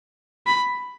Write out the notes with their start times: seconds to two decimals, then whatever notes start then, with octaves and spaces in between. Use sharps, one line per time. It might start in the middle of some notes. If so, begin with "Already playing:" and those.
0.46 B5